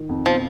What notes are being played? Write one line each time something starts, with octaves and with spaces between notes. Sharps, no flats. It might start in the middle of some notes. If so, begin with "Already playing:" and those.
Already playing: D#3
F2
B2 F3